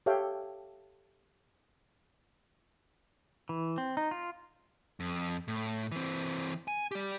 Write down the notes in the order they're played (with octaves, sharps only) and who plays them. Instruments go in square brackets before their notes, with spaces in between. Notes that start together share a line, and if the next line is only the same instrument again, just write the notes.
[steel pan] G4 A4 C#5 E5 F5 G5
[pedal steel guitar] E3
C4
D#4
F4
[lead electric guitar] F2
A2
E3 C4
G#5
G4 D5